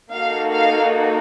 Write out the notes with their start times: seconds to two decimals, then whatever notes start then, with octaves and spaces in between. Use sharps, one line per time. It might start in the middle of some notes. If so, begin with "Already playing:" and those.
0.13 A#3 D#4 F#4 A4 F5
0.52 F5